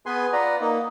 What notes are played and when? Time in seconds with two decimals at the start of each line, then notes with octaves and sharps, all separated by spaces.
0.06 B3 G#4 B4 G#5 C6
0.33 F4 B4 D5 F#5 A#5
0.60 A#3 D#4